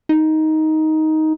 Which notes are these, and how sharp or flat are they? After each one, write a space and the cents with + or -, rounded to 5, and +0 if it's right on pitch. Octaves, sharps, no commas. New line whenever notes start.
D#4 +10